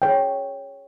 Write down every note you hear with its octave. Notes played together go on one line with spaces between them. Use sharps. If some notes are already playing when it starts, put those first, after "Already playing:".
G#4 C#5 G5